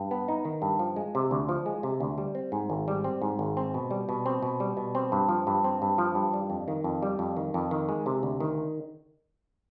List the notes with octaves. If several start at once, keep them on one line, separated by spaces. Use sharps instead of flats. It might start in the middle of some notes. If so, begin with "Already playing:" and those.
Already playing: G2
B3
D#4
D#3
G2
F3
G#3
C3
D2
F3
G#3
C3
D2
G3
C4
G#2
G#1
G3
C4
G#2
G#1
C4
B2
G3
B2
C4
B2
G3
B2
C4
G2
F3
G2
C4
G2
F3
G2
G3
F2
D#3
F2
G3
F2
D#3
F2
D#3
G#3
C3
D2
D#3